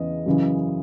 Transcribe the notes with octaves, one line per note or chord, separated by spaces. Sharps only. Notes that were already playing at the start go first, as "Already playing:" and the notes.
Already playing: E2 C#3 E3 D#5
F#2 C#3 E3